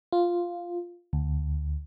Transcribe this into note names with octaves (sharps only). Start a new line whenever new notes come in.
F4
D2